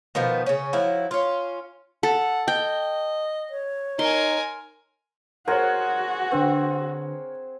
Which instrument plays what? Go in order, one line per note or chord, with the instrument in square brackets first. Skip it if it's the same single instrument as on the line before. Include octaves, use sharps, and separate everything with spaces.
[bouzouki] B2 D#3 F3 B3
C#3 C#4
F3 F#3 E4
C#4 F4
[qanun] A4 [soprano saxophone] F#5
[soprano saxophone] D#5 [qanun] G5
[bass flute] C#5
[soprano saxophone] D#4 [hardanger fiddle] A#4 G#5 [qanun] C6
[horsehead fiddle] F#4 [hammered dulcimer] G#4 C5 F#5 [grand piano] A#4 C#5
[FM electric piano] D3 D4 B4 [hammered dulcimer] C4